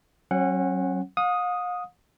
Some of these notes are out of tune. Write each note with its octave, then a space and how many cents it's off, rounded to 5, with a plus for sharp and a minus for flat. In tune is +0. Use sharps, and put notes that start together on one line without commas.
F#3 +15 C#4 -35 F#5 +0
F5 +45 D#6 +0